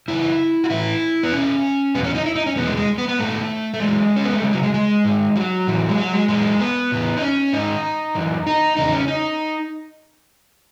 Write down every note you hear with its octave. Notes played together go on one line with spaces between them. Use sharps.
F#2 C#3 E3 E4
F#4
A2 E3 E4
B3
E2 B2 C#4
E2 B2 B3
C#4
D#4
E4
D#4
C#4
E2 B2 B3
G#3
G#3
B3
B3
G#2 D#3 A3
A3
F#2 E3 G#3
C#4
B3
A3
F#2 C#3 G#3
F#3
G#3
G#3
G#2 D#3
F#3
A2 E3
G#3
F#3
G#3
F#2 E3 G#3
B3
A2 E3
D#4
C#4
G#2 D#3 D#4
F#2 E3
D#4
E2 C#3 D#4
C#4
D#4